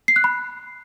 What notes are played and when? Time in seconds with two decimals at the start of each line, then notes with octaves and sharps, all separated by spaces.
0.08 C7
0.16 F#6
0.24 B5